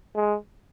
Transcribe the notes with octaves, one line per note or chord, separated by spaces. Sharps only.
G#3